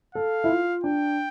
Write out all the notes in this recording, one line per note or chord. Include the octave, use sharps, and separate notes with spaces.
A4 F5
E4
F4
D4 G5